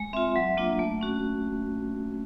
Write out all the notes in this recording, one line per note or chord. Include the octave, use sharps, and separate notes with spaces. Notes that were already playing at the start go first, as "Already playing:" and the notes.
Already playing: G#3
C4 F4 E5
F#3
A#3 D4 F4
A3
C#4 F#4